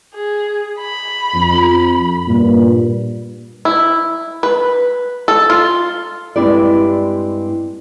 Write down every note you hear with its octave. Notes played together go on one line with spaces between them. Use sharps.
G#4
B5
F2
G2 A#2
E4
B4
A4
F4
G2 G#3 C4 E4 G4 D5